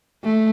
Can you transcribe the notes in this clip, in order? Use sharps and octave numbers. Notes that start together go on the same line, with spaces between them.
A3